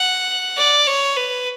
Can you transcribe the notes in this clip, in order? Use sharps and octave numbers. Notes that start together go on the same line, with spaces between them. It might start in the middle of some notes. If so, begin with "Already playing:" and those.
Already playing: F#5
D5
C#5
B4